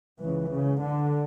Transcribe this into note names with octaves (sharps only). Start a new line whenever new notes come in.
C#2 C#3 E3
C#3
D3